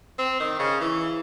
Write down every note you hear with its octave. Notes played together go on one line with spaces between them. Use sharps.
C4
D#3
C#3
E3